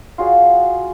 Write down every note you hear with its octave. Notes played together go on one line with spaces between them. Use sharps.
F4 F#4 G#4 D5